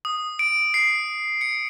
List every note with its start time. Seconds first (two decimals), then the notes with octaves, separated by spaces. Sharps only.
0.05 D#6
0.39 D7
0.74 C7
1.41 C#7